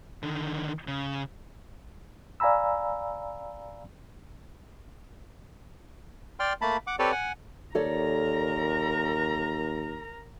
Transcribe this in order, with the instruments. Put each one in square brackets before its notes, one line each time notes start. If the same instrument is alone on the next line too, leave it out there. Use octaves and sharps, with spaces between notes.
[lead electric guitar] D3 D#3
C#3
[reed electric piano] D5 F5 G#5 A#5 B5 E6
[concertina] D5 G5 C6 F6
A3 A#3 A5 B5
F#5 D6
C4 G4 A4 B4 C#5 D5
F#5 G#5
[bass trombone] D#2 [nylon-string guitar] A4 C#5 D5 [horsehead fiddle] A#4 A#5